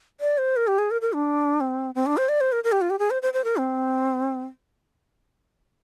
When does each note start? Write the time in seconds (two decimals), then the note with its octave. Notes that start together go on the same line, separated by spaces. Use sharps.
0.21 D5
0.38 C5
0.56 A#4
0.67 G4
0.78 G#4
0.91 A#4
1.02 A#4
1.13 D4
1.60 C4
1.95 C4
2.06 D4
2.17 C5
2.29 D5
2.41 C5
2.52 A#4
2.64 A#4
2.72 G4
2.81 F4
2.90 G4
2.99 G#4
3.11 C5
3.22 C5
3.33 C5
3.44 A#4
3.57 C4